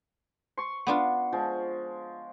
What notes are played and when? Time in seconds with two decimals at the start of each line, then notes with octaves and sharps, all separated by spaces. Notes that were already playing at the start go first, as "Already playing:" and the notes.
0.58 C6 C#6
0.87 B3 D4 F4
1.33 F3 G#3